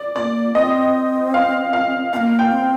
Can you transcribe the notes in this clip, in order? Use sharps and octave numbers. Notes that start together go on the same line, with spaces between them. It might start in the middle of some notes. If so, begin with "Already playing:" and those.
Already playing: D5
A#3 C4 D5
C4 D#5
F5
F5
C4 F5
A#3
G5
C4